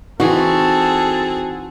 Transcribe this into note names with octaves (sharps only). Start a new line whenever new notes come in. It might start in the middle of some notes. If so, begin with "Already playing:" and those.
E3 C4 D#4 F#4 G#4 A4